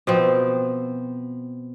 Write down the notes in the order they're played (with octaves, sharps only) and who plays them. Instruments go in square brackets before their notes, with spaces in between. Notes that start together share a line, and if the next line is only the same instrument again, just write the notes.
[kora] B2 F3 C4